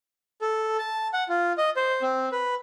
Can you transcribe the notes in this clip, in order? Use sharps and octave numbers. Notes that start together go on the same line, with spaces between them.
A4
A5
F#5
F4
D#5
C5
C4
B4